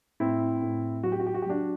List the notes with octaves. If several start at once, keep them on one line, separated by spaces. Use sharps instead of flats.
A2 C4 E4
A2
F#3 F#4
G4
F#4
G4
F#4
G4
F#3 D4 F#4